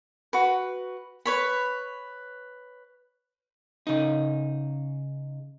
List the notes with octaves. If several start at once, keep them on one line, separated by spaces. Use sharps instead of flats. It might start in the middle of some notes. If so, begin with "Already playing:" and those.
F#4 B4
B4 C#5 B5
C#3 D#4